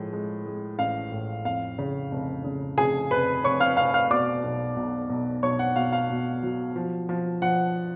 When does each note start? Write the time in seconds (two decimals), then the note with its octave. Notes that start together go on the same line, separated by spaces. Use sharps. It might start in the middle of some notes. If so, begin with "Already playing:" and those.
Already playing: A2 F3 G#3
0.13 G#3
0.46 G#3
0.79 A1 F5
1.12 A2
1.45 F2 F5
1.79 C#3
2.11 F1
2.44 C#3
2.78 F1 G#4 G#5
3.11 F1 B4 B5
3.44 F1 C#5 C#6
3.60 F5 F6
3.77 F1 F5 F6
3.94 F5 F6
4.10 B2 D5 D6
4.44 B1
4.77 B1
5.10 B1
5.43 B1 C#5 C#6
5.59 F#5
5.76 B2 F5
5.93 F5
6.10 B2
6.43 F#3
6.76 F3
7.09 F3
7.42 F3 F#5